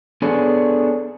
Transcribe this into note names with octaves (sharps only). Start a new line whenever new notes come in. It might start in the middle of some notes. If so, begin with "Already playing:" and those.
B3 D4 G#4 A4 C#5